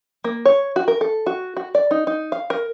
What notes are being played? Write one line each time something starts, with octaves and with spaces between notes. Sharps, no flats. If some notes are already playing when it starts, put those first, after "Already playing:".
A#3
C#5
F#4
A#4
A4
F#4
F#4
D5
D#4
D#4
F5
A#4